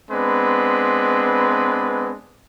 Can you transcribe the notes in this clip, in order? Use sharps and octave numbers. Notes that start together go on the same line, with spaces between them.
G#3 B3 C4 D4 B4